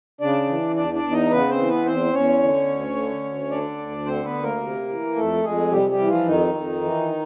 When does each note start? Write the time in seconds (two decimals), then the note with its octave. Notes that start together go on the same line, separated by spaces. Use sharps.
0.21 C#3 D4 D5
0.48 E3
0.76 E2 D4 D5
0.94 D4 D5
1.03 E2
1.12 D#4 D#5
1.31 C#3 B3 B4
1.49 C4 C5
1.58 E3
1.67 B3 B4
1.85 E2 C4 C5
2.13 E2 C#4 C#5
2.41 D3
2.68 D2
2.95 D3
3.24 D2
3.50 D3 D4 D5
3.78 D2
4.06 D3 C4 C5
4.25 B3 B4
4.33 D2
4.43 A#3 A#4
4.61 C3
4.88 E3
5.16 F2 A3 A4
5.44 F2 G#3 G#4
5.71 C3 G3 G4
5.90 G3 G4
5.98 E3
6.07 F3 F4
6.26 F2 D#3 D#4
6.54 F2
6.81 E3